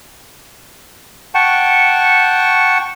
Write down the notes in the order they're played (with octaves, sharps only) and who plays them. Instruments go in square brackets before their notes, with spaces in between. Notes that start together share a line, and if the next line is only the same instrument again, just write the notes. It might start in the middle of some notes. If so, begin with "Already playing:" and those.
[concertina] F#5 G5 A5 C#6